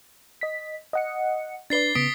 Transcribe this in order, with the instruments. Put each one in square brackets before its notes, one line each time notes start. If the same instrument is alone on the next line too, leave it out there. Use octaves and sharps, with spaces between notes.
[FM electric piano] D#5 B6
D#5 F#5 C#7
[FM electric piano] D4 B4 D5 [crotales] A6 C7 G7
[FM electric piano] C#3 B3 [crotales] D#6 B6 D7